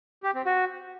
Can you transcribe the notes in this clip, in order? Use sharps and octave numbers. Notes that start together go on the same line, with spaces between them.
G4
C4
F#4